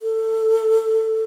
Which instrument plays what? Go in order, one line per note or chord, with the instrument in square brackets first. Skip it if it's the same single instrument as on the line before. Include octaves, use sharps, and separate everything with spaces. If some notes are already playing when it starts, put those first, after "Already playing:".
[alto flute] A4